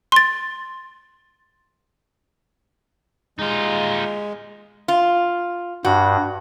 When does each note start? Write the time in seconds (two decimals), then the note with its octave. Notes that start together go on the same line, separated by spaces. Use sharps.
0.12 C6 A6
3.39 G#3 D#4 F4
4.88 F4
5.85 G2 F#4